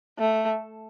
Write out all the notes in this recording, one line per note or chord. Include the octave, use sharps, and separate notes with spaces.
A3